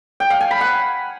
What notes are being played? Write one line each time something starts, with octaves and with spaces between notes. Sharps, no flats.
G5
F5
G#5
B5
F#5